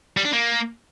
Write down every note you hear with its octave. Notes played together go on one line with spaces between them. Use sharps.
G3
D4
A#3